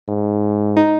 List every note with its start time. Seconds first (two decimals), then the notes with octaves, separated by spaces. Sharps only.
0.08 G#2
0.77 D#4